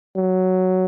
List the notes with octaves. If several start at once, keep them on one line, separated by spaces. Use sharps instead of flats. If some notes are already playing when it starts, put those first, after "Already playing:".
F#3